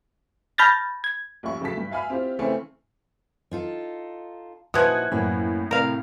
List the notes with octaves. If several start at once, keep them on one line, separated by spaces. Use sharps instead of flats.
A5 B5 F6 G6 A6 A#6
G#6
A#1 G3 C#4 G4 E5 C#6
C#3 F#3 A3 A5 B6
G2
E5 F5 G#5 B5 F6
C4 E4 F4 G4
C#3 E3 A3 C4 C#4
D#4 F4 A4
A#2 E3 F3 D#4 F#4 D#6 F#6 G#6
F#2 A2 A#3 C#4
C3 A3 A#4 F5